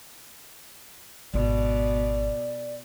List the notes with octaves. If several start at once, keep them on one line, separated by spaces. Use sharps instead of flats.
G#1 B2 D5